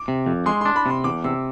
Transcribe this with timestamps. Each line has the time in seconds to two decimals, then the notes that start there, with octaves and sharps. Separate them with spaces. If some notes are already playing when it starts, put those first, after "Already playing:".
Already playing: D6
0.08 C3
0.27 F2
0.46 G#3 C6
0.61 D4 C6
0.76 B5
0.86 C3 C6
1.04 E2 D6
1.24 C3 E6